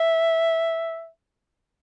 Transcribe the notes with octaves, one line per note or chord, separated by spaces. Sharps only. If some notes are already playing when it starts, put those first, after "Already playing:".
Already playing: E5